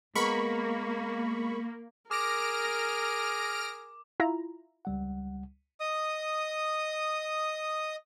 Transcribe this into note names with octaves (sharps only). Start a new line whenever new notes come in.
G#3 A#3 B3 A#4 B5 C#6
G#4 A#4 D6 F6 A#6 D7
E4 F4 A#5
C#2 G3 F#5
D#5 D#6